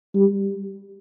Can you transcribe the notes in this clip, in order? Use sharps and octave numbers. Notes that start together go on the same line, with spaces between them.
G3